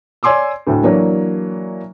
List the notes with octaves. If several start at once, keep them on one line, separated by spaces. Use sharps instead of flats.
C#5 D5 G#5 C6 D6 E6
D2 A2
E3 F#3 A#3 D4 C#5